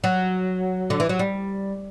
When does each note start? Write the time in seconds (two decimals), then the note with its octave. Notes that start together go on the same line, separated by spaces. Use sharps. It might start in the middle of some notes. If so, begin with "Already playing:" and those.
0.04 F#3
0.90 D3
1.00 E3
1.09 F#3
1.19 G3